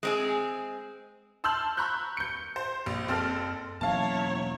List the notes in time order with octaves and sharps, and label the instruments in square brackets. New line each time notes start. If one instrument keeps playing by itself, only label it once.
[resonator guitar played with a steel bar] G#3 C4 G#4
[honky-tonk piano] A5 C6 E6 F6 G6 F#7
A#5 B5 C#6 F#6 G6
G6 C#7
C5
A#1
F#1 C4 A4 F6
[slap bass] E1 A#3 C#4 [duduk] F#3 [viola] E4 C#5 [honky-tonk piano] F5 A5